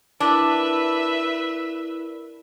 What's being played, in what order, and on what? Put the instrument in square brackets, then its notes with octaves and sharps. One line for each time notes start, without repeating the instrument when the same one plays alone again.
[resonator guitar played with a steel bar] D4 [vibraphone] E4 A#4 [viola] B4 E5